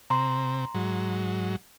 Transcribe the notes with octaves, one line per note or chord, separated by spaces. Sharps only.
C3 A#5 C6
G#2 F#3